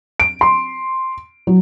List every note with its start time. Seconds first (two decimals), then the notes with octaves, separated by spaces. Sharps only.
0.20 D7
0.41 C6
1.47 F#3